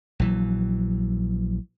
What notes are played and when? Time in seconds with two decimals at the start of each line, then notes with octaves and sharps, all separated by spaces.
0.20 A#1 E3 F#3